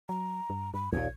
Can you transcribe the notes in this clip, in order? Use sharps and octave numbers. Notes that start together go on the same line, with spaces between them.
F#3 A#5
G2
G2 B5
A#1 D#2 A#2 G#6